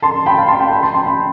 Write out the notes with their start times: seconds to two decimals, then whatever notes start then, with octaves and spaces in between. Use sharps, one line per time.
0.02 A5 C6
0.26 G5 B5
0.37 F5 A5
0.48 A5 C6
0.59 G5 B5
0.72 G5 B5
0.83 A5 C6
0.94 A5 C6
1.06 G5 B5